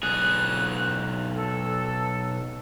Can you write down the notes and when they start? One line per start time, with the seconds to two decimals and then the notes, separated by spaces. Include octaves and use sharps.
0.03 B1 G#4 F#6
1.36 A4